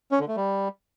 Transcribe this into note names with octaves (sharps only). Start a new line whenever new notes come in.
C#4
D3
A3
G3